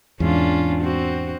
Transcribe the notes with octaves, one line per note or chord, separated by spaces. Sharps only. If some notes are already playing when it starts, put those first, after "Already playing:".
E2 G#2 C#4 D4 F4
C4 F#4